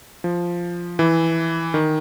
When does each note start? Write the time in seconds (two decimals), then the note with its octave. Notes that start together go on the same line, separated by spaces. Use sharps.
0.24 F3
0.99 E3
1.74 D#3